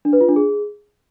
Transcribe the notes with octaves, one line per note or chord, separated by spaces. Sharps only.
D4
B4
F4
D4
G#4